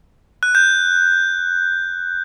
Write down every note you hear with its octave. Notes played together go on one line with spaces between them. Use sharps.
F#6
G6